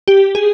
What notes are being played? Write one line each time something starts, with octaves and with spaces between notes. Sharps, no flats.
G4
G#4